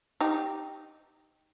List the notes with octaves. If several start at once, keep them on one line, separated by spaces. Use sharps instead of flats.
D#4 G4